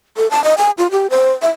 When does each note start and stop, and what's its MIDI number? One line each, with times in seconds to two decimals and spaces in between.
0.17 0.30 69
0.31 0.43 81
0.44 0.55 75
0.58 0.71 80
0.78 0.90 65
0.91 1.07 67
1.10 1.31 72
1.42 1.50 76